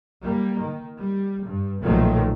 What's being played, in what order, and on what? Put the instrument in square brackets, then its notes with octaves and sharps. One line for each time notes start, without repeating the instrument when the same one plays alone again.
[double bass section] G3 A#3
D#3
G3
G2
B1 A#2 D#3 F3 F#3 A3